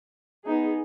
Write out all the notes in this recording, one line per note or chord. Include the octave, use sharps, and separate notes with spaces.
B3 D#4 G#4